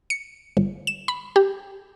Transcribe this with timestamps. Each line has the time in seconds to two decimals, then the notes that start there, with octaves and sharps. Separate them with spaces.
0.10 C#7
0.57 G1
0.87 E7
1.08 B5
1.36 G4